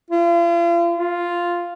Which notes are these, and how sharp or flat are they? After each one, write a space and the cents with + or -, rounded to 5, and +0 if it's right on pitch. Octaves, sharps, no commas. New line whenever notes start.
F4 -40
F4 +0